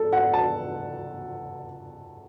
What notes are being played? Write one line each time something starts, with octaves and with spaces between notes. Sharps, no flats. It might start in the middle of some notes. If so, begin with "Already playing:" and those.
Already playing: A4
F#5
A5